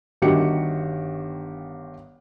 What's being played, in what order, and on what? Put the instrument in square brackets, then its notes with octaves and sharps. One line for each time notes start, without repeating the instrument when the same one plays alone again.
[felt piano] G1 G2 D#3 F#4 G4 C#7